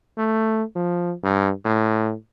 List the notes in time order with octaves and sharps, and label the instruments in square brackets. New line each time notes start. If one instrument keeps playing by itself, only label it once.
[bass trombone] A3
F3
G2
A2